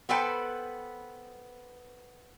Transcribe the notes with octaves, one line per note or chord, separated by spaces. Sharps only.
B3 A4 B4 C5 G5